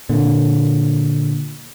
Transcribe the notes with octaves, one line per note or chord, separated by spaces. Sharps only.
A#2 D3